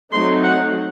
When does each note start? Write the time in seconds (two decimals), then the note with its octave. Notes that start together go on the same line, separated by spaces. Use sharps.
0.12 F#3 A3 C4 D#4 C6
0.43 F#5